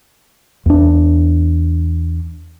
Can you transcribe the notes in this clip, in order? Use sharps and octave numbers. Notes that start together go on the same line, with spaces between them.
E2 D4